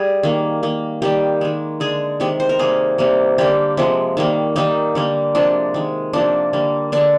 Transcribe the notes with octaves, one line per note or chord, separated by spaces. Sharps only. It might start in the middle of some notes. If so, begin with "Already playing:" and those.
Already playing: G3 G#4
D#3 A#3
D#3 A#3
D#3 G3 A#3 G4
D#3 G#3
D3 G#3 G#4
C3 D#3 G#3 G4
C5
A#4
C3 G3 A#3 G#4
C3 G3 A#3
D3 G3 A#3 G4
C3 F3 G#3
D#3 G3 A#3
D#3 G3 A#3 D#4
D3 G3 A#3
C3 F3 G#3 D4
D#3 G#3
C3 F3 A#3 D4
D3 G3 A#3
D3 G#3 D4